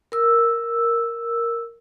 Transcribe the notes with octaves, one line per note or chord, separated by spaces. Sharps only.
A#4 E6